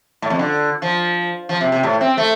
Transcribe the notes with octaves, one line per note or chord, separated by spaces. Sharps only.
A2
F2
D3
F3
F3
C3
C3
A2
C4
A3